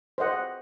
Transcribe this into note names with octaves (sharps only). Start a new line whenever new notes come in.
C5 D#5 F#5